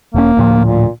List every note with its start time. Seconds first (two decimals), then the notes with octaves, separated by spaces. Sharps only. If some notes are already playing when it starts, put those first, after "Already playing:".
0.15 E1 A#3 C#4
0.37 D2 A2 F3
0.64 A#2